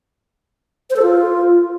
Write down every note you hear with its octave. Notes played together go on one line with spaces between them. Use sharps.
C5
A4
F4